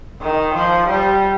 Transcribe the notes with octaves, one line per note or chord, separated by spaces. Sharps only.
D#3
F3
G3